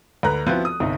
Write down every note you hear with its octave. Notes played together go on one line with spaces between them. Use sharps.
D2 B4 A#5 F#6
F3 B3 C4 E4 F#4
D#6
G1 C2 D#4